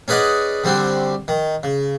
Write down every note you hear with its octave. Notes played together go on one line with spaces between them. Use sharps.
C#4 G#4 B4 D5 D#5 F#5
D3 G3 C4 F#4
D#3
C#3